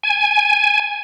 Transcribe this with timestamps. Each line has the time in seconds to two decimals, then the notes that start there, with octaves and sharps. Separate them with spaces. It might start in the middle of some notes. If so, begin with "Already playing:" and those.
0.03 G#5